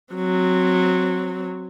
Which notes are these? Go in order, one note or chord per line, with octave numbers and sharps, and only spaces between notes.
F#3 C4